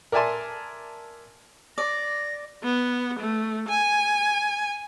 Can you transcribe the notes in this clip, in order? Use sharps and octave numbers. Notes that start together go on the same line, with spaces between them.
A#4 D5 E5 G#5 A5 C6
D5 A#6
B3
A3
G#5